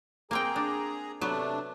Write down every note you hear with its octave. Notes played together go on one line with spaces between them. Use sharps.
A#3 C4 G#4 G5 A#5
D4
C3 F#3 A3 B3 D4